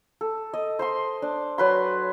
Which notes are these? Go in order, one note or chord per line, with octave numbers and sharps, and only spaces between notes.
A4
D#5
C5 D#5 C6
D4
F#3 B4 C6